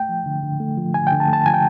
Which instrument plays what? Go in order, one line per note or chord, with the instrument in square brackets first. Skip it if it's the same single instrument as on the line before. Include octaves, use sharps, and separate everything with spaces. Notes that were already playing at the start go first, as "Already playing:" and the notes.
Already playing: [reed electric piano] A3 G5
F3
D3
D3
A3
F3
D3 G#5
G5
D3
A5
A3
A5
F3 G#5
G5